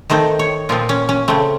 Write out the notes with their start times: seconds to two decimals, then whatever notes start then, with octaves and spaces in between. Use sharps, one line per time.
0.10 D#3 A3 C4 C5
0.39 C#5
0.69 A#2 F3 C4 F4
0.89 C#4
1.09 C#4
1.28 C#3 A3 C4